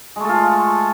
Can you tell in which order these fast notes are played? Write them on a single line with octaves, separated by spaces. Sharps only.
G#3 A3 A4 F4